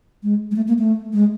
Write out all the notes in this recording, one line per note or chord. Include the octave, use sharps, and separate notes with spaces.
G#3
G#3
A3
A#3
A3
G#3